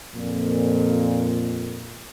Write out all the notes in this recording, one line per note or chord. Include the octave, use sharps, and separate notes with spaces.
F2 A#2